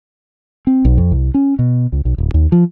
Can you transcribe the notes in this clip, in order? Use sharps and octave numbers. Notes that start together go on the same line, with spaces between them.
C4
B1
F2
C2
C#4
B2
C#2
B1
D1
D#2
F3